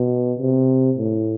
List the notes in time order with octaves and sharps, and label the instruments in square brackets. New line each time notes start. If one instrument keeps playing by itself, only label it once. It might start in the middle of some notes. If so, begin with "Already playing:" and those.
Already playing: [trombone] B2
C3
A2